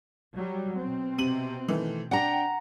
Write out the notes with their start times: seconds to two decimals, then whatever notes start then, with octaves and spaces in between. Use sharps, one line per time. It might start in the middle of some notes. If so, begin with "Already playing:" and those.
0.36 F#3 G3
0.80 B2 C4
1.18 C3 D#7 F#7
1.68 D#3 E3 A3
2.11 D4 F#5 G5 A#5